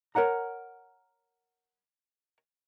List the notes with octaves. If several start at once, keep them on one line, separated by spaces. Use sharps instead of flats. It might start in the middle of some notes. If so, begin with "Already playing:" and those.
A#4 C#5 F#5 A#5